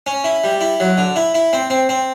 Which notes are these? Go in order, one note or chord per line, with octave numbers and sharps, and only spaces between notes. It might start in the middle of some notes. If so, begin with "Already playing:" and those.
C#4
E4
G3
E4
F#3
D3
E4
E4
C4
C4
C4